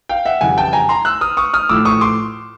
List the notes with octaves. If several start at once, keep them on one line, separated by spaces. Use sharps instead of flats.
F5 G5
E5 F#5
F2 C#3 E3 G3 F#5 G#5
G5 A5
G#5 A#5
A#5 C6
E6 F#6
D#6 F6
C#6 D#6
D#6 F6
A2 F3 A3 D6 E6
C#6 D#6
C6 D6